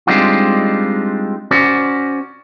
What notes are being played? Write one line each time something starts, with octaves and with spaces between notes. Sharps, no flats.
G3 G#3 C4 D4 D#4 F4
C#4 F#4 C5 D5